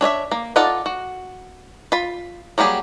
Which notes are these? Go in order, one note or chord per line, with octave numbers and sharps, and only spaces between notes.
D4 C#5 D#5 E5
A#3
D#4 F4 A4 D5 F#5
F#4
F4 B5
F#3 G3 A#3 G4 G#4